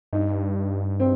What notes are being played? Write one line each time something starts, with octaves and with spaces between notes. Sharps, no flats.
G2 D#4
C4